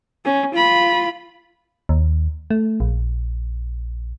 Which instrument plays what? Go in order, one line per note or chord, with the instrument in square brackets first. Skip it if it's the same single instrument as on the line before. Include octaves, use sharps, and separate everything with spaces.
[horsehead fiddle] C#4
F4 B5
[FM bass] D#2
A3
A#1